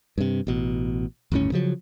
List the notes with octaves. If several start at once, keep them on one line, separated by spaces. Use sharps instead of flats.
G2 C3
A1 B2
G1 D#2 A2 C#4
C#3 F3 F#3